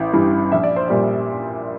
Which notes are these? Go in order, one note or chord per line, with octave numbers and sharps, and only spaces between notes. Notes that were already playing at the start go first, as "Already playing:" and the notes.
Already playing: A1 E4
G2 E3
A#1 E5
D5
C5
A#2 G3 D5